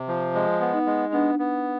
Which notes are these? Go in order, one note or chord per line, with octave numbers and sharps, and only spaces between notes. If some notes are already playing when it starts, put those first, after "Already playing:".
Already playing: C3
F3
G#3
B3
D#4
G#3
B3 D4
B3